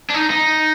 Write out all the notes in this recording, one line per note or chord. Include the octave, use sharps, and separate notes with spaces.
D4
D#4
D#4